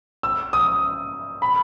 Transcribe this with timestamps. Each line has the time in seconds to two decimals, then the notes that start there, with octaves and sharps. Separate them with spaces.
0.23 E6
0.53 D#6
1.42 B5